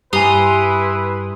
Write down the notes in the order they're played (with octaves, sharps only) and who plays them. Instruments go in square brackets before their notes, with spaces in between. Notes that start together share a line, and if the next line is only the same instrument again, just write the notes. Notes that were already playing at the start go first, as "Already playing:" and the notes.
[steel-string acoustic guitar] G2 A#5 [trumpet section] E4 B4 [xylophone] G4 G#5 [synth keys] C6 D#6